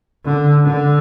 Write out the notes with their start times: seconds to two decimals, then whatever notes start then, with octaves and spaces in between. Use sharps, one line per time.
0.25 D3
0.64 D3